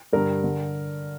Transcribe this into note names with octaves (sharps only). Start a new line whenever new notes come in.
G2 D3 A#4
D3